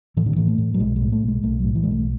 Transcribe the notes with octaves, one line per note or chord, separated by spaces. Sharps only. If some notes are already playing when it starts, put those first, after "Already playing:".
A2 E3
D3
A2 E3
A3
A2
F#3
B1 G#3
G#3
A2
A3
B1
G#3
B1 A3
A2 F#3
E3
B1 G#3
A3